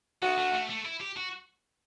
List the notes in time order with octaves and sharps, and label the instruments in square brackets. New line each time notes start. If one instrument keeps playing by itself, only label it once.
[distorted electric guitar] B3 [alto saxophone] F#4
[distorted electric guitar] A3
A3
A3
E4
G4
F#4